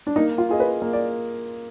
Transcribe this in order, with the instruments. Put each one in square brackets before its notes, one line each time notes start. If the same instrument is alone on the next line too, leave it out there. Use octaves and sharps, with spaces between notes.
[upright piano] D4
[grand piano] A#3 [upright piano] D#4
[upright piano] F4
[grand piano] F4 G#4 D#5
[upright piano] B4
[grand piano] A#3
[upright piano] D5